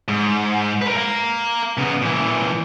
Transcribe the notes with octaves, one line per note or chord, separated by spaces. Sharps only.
G#2
A#4 B4
F5 A#5
C#3 B3
A#2 E3